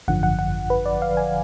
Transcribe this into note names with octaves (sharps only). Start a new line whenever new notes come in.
G#1 F#2 D3 F3 F#5
F#5
F#5
B4
D5
F5
G#5